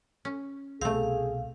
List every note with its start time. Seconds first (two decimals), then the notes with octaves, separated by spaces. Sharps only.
0.25 C#4
0.81 C2 B2 A3 C4 G#4 F5